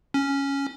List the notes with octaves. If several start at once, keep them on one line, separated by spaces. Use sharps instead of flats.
C#4